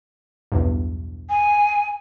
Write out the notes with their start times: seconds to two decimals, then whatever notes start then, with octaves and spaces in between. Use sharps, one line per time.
0.52 B1 E2 G2
1.30 G#5